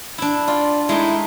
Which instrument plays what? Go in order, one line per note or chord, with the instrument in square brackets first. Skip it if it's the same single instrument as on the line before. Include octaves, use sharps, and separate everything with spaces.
[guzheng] D4 E4
[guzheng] F4 [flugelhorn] D5
[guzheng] G#3 A3 D#4 [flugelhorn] E4